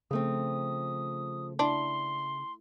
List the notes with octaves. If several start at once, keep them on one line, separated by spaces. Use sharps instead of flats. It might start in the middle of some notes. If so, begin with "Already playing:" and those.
C#3 F3 A3 C4 D#6
D4 E4 C6